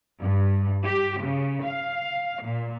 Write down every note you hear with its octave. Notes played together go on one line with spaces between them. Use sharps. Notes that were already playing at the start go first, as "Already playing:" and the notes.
G2
G4
C#3
F5
A#2